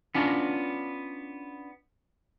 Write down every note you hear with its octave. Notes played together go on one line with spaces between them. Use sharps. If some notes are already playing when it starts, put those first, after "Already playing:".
B3 C#4 D4 F4